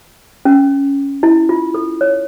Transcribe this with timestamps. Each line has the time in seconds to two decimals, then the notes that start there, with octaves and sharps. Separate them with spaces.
0.45 C#4
1.23 E4
1.49 F4
1.74 A4
2.01 C#5